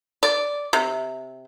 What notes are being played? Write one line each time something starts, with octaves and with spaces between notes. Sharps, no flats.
D5
C3